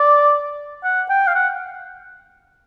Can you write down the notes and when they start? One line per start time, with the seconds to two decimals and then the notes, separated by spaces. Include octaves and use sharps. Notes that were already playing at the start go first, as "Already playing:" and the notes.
Already playing: D5
0.84 F#5
1.10 G5
1.27 F5
1.35 F#5